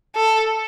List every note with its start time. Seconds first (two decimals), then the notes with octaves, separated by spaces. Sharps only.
0.15 A4